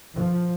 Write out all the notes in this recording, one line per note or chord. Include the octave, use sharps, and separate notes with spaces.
F3